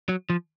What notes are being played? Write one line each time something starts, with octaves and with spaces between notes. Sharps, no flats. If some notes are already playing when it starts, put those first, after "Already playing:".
F#3
F3